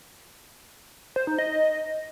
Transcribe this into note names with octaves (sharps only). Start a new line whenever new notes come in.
C5
D#4
D#5